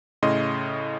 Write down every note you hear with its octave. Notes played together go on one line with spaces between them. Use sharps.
A2 C#3 D#5 C6